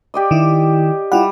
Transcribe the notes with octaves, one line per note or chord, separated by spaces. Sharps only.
G4 D5 D#5
D#3 E4
G3 E4 F4 F#5